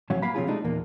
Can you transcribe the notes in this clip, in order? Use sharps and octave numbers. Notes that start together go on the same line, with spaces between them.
A2 F#3 C#4 F5 F#5
A#3 F5 F#5 B5
C3 F3 C#4 F4 G#4
G#3 A3 D4 D#4
E2 A#2 A#3